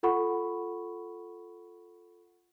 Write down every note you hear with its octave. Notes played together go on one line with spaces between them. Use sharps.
F4 A4 F#5 B5 C#6